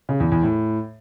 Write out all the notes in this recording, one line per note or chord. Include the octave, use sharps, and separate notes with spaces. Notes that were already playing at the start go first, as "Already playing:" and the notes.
C#3
E2
E2
A2